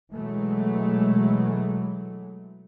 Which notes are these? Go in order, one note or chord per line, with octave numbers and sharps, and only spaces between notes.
B2 E3 F#3 G#3 A3